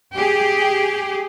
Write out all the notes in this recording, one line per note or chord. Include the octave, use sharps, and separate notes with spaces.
G4 G#4